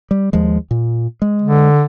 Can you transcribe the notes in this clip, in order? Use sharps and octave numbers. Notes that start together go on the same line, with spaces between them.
G3
D#2 F3 G#3
A#2
G#3
D3